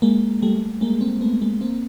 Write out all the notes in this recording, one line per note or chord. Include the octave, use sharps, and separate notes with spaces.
G#3 A#3
G3 A3
G#3 A#3
A#3 C4
A3 B3
G#3 A#3
A#3 C4